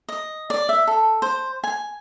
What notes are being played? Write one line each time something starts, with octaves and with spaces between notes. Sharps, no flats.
D#5
D5
E5
A4
C5
G#5